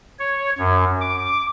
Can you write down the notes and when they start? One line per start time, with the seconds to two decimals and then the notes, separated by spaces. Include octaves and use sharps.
0.19 C#5
0.58 F#2
1.01 D6